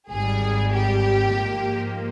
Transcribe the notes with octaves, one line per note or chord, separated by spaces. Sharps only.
G#1 G#2 G3 G#4
G4
G#2 F3 A#3